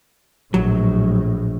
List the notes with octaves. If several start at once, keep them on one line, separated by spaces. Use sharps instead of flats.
A#1 A2 F#3